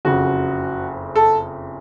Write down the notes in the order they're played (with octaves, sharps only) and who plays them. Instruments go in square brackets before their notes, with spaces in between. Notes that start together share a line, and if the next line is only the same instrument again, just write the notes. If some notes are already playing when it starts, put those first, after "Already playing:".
[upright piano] F#1 F2 C#3 F#4
A4